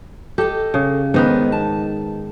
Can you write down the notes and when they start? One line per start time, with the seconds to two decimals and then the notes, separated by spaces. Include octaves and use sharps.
0.38 G4 A4 D#5
0.74 C#3
1.14 G#2 D#3 B3 B4
1.52 A5